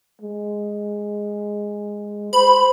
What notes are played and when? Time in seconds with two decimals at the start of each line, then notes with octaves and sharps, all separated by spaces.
0.22 G#3
2.33 C5 B5